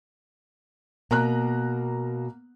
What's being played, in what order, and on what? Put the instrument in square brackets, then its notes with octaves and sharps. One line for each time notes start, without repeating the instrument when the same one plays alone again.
[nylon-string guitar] B2 [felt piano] A#3 A#5 F#6